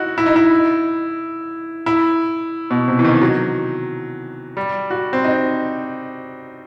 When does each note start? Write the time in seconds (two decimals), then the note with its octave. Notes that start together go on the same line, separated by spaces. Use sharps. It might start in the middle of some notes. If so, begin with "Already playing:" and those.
Already playing: D#4 E4 F#4
0.18 E4
0.26 D#4
0.36 E4
1.86 E4
2.71 B2
2.88 C3
2.99 E3
3.05 D#3
3.21 F#3
4.57 G3
4.90 F#4
5.13 C4
5.24 D#4